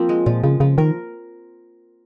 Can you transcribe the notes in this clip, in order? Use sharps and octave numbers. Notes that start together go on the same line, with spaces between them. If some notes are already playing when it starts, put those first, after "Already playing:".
Already playing: F3 A#3 C4 F4
G#3
A#2 F3
C#3 F3
C#3 F3
D#3 A#4